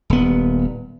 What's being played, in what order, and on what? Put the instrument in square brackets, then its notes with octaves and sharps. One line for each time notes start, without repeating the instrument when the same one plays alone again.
[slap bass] D#1 B3